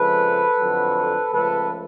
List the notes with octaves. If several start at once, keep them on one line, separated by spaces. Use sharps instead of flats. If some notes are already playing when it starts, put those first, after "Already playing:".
Already playing: F2 C#3 F3 G#3 A4 B4
F2 D3 F#3
C#2 C#3 F3 A3 A4 B4